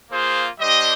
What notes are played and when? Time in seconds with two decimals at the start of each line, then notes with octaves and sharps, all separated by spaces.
0.10 A#3 F4 G#4 C5
0.59 G3 D4 G4 C5 D#5